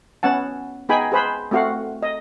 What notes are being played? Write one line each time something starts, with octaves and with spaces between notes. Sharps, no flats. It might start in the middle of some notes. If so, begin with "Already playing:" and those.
B3 C#4 F#5 A5
B3 D#4 G#4 G5 G#5 B5
G#4 B4 C5 B5
A3 C4 F#4 F5 F#5
D#5